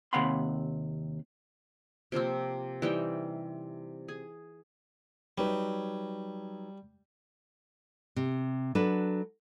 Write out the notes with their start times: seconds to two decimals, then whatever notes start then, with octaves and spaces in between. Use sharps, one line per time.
0.13 D#2 C3 F5 F#5 B5 C6
2.12 C3 F3 A#3 C4
2.82 E3 G3 D#4 G5
4.08 G#4
5.38 F#3 G3 D#4 B4
8.16 C3
8.75 F#3 D4 A4 B4